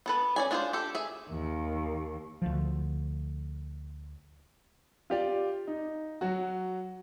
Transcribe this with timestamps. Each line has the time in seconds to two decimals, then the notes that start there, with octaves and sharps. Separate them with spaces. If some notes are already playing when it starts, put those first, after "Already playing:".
0.06 B3 A4 B4
0.36 C#4 D5 G#5
0.51 D4 F4 G#4 B4 C5
0.73 G4 A4
0.95 G#4 E5
1.29 D#2
2.42 D2 F3
5.10 F4 G4 D5
5.67 D#4
6.21 F#3 F#4